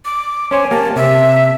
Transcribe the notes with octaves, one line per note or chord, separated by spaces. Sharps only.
D6
C#4 C5 C#5 G#5
A#3 G4 A5
C3 E5